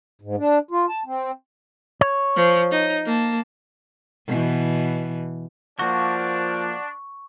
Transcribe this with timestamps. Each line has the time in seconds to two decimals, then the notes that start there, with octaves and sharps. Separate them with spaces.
0.21 G#2
0.38 D4
0.71 F4
0.89 A5
1.06 C4
2.01 C#5
2.36 F3
2.71 D#4
3.05 A#3 A5
4.27 B2 E3
5.79 F3 A#3 D4 F#4 C#6